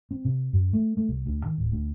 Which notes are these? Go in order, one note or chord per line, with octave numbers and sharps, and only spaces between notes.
C4
C3
F#2
A3
A3
C2
D2
D#3
D1
D2